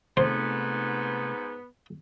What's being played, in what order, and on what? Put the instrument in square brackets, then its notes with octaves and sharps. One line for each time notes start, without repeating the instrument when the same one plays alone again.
[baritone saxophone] G#2 [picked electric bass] C3 A3 [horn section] B3 [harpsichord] C5